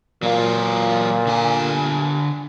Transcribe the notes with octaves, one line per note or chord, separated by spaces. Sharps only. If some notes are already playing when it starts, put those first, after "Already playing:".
A#2 F#3 F4
D3 G#5